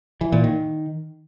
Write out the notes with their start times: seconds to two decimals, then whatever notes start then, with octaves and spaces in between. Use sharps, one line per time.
0.21 E3
0.32 A#2
0.44 D#3